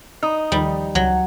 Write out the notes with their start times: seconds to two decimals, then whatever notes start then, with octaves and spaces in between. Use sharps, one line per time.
0.23 D#4 D#6
0.52 D#2 D#3 F3 G3
0.95 C#2 F#3